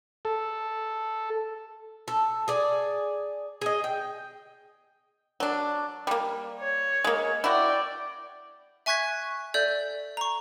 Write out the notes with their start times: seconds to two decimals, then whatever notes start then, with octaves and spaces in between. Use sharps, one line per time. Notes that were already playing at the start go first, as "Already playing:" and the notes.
0.25 A4
2.08 A4
2.48 G#4 D5
3.61 G#4 D#5
3.84 G5
5.40 F#3 D4
6.07 G3 A#3
6.60 C#5
7.04 G#3 A#3
7.44 E4 F#4 D5 G5
8.86 E5 G#5 C#6 F#6 G#6 B6
9.54 A4 D5 E5 G6
10.17 A#5 C#6